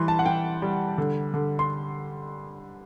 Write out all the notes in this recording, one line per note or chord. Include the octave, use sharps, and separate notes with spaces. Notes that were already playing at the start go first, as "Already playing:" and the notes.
Already playing: E3 G3 C6
A5
F#5
E3 G5
G3
D3
D3
C6